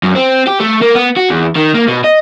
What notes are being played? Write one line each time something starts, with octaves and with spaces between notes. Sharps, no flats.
F#2
C4
G4
A3
A#3
B3
F#4
E2
D#3
A#3
B2
D#5